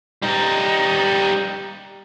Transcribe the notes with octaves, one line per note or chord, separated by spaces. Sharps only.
G3 D#4